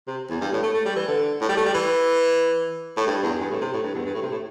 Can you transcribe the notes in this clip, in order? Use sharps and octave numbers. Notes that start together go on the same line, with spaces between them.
C3
E2
G2
A2
A3
A3
G3
E3
D3
A2
G3
A3
G3
E3
A2
G2
E2
G2
A2
C3
A2
G2
E2
G2
A2
C3
A2